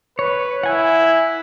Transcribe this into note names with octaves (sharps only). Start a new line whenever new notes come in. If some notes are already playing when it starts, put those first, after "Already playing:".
B4 C#5
E4 F#5 G#5